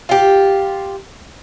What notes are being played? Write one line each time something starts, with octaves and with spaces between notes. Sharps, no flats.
F4 G4